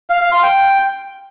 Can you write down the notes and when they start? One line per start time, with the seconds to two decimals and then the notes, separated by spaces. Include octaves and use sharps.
0.10 F5
0.21 F5
0.32 C6
0.43 G5